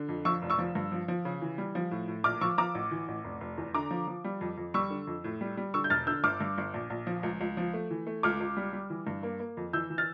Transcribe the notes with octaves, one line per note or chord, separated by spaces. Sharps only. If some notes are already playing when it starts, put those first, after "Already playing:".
Already playing: D3
F2
F3 C#6 E6
F1
C#6 E6
F3
G2
F3
F3
C#3
E3
G3
F3
A2
A2
A#1 D6 F6
F3 C#6 E6
F3 A#5 D6
A1
E3
A1
F1
F1
E2
D3 A#5 D6
F3
F3
G3
F2
F2
G3 C#6 E6
D3
F2
A2
G3
G3
D3 C#6 E6
G6
E1 F6 A6
D3 E6 G6
G1 D6 F6
G2
G1
A#1
A#1
F3
C#2
C#2
F3
A3
E3
A3
C#2 D6 F6
C#2
G3
G3
E3
G2
A#3
A#3
F2
E3 E6 G6
E3
F6 A6